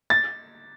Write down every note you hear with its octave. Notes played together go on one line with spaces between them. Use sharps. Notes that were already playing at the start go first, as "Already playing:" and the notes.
A6